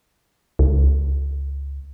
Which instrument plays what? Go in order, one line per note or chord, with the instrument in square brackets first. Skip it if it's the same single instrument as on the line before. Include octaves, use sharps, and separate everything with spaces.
[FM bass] C#2